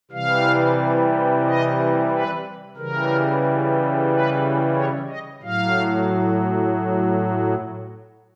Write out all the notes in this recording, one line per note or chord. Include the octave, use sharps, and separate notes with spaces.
C3 E3 G3 F5
D#5
B4
C#3 E3 G3 A#4
B4
C#5
D#5
A2 F#3 F5